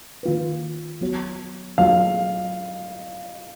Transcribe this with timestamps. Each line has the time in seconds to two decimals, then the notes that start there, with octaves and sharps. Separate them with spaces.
0.23 D#3 A#3 F4 B4
1.01 F#3 B3 F#4 C#5
1.78 F#3 A#3 F4 G#4 F5